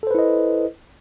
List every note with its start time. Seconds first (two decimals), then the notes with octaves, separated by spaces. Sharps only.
0.03 A4
0.07 C5
0.11 B4
0.15 E4
0.19 D#5